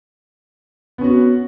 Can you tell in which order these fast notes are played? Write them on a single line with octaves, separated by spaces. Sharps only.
B3 C#4 F#4